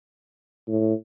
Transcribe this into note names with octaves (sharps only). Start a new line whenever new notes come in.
A2